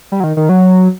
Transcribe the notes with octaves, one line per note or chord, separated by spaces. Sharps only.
G3
F#3
D#3
D#3
F#3